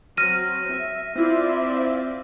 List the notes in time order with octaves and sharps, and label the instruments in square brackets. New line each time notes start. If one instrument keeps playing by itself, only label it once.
[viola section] F#3 C4 [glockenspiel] F6 A#6 D#7
[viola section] E5
[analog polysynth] C4 E4 F4 [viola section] C5 D5 E5